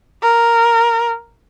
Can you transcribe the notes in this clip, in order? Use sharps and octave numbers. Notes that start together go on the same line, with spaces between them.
A#4